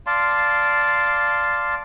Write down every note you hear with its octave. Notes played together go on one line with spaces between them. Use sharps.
D5 F5 A5 C6